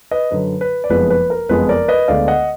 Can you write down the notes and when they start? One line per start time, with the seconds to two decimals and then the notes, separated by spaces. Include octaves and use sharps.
0.11 B4 D#5
0.31 F#2 D3 F#3 B4
0.61 B4
0.84 D5
0.90 F#1 F2 F3 G#3 B3 B4
1.10 B4
1.30 A#4
1.49 F#1 F2 F3 G#3 B3 B4
1.69 A#4 D5
1.88 B4 D#5
2.08 D2 D3 G#3 B3 D5 F5
2.28 D#5 F#5